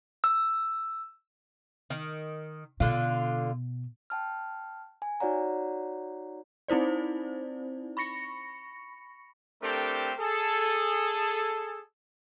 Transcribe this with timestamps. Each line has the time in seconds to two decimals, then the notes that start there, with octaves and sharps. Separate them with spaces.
0.24 E6
1.90 D#3
2.80 B2 D3 F4
4.10 G5 A5 F6
5.02 G#5
5.20 D#4 F#4 C#5 D5 F#5 A#5
6.68 C4 D#4 E4 C5 D5
7.97 B5 C#6 A#6 C#7
9.62 A3 C4 D4 G4 A4 A#4
10.19 G#4 A4